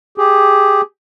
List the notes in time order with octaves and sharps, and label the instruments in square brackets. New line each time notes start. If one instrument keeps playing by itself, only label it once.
[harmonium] G4 G#4